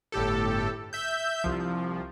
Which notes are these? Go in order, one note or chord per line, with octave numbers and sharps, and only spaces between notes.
G1 A2 G4 A4
E5 G6
C2 F3